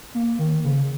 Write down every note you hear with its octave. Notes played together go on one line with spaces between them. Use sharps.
A#3
D#3
C#3